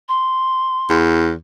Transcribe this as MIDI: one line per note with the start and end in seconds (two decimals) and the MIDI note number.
0.09 0.97 84
0.89 1.34 40